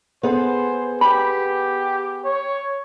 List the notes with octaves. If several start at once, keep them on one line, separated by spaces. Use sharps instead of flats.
B3 G#4 A4 C5
G4 B5
C#5